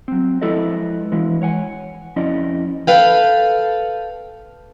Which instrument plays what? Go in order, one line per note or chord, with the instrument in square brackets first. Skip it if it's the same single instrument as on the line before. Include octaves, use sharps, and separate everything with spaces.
[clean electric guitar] F#3 C4
F3 G#3 E4 A4 B4 D#5
E3 G#3 E4
C#5 F#5 G#5
F2 F3 C#4 E4 D5 D#5
[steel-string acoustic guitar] A4 B4 F5 G5